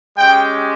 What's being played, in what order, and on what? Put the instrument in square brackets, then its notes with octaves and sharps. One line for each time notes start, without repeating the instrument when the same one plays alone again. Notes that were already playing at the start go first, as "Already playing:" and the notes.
[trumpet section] G#3 C#4 G4 G5